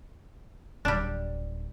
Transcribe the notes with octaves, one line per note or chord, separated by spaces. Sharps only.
D1 G3 D4